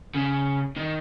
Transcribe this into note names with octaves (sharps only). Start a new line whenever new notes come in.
C#3
D#3